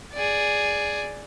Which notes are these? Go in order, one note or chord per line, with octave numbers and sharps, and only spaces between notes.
G#4 D5